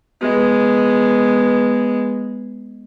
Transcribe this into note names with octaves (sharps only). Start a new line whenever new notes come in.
G#3 B3